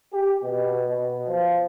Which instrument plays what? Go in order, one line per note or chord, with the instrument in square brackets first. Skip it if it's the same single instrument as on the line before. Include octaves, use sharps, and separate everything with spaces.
[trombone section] G4
B2
B2
F3